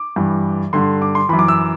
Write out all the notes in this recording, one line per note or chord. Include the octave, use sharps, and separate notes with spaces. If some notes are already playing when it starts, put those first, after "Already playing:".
Already playing: D6
G2 E3
G2 D3 C6
D6
C6
F#2 E3 B5
D6
E6